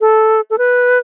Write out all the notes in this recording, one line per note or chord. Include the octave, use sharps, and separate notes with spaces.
A4
A4
B4